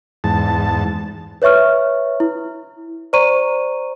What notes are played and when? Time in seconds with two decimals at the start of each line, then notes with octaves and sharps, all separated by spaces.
0.24 E2 G#2 A5
1.42 B4 C#5 E5 C#6 F6
2.20 E4
3.13 C5 D5 A#5 C#6 D#7